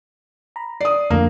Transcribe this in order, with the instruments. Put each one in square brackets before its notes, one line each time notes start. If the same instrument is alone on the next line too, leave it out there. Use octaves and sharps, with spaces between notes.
[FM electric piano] A#5 B5
[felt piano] D5 D#6 [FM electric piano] C7
[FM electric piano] F2 D3 [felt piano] A#3